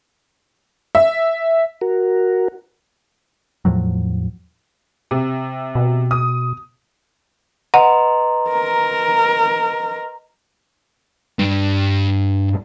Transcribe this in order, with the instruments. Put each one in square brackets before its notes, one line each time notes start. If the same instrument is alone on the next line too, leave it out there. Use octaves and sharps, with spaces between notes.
[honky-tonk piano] E5
[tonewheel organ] F#4 A#4
[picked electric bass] E2 A2 F3 F#3
[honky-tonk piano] C3
[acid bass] B2
[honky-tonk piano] D#6
[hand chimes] B4 D#5 C6 [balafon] F#5 [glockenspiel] A#5
[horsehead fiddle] A#4
[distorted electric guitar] G2